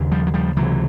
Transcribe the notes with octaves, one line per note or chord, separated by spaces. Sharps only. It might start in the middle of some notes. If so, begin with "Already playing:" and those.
Already playing: D#2 C#3
F3 G3
F#3
F3 G3
C#2 C3 E3 F#3